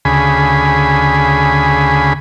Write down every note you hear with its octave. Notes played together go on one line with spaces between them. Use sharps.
D2 C#3 G#4 B5